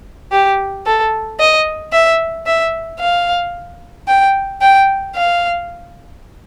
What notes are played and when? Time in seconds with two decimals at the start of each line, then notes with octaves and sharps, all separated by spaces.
0.32 G4
0.86 A4
1.40 D#5
1.93 E5
2.46 E5
3.00 F5
4.08 G5
4.61 G5
5.15 F5